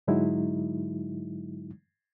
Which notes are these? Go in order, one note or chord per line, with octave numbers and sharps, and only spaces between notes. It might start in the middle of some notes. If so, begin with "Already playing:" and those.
G#2 D3 F#3 G#3 D#4 E4